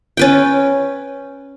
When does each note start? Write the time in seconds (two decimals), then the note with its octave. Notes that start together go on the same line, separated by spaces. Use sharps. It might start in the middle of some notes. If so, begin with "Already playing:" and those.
0.17 C#4 B4 G5